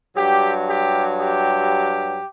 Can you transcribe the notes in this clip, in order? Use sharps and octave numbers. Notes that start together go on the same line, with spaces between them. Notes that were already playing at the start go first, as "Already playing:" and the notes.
G2 F#3 G4
G4
G4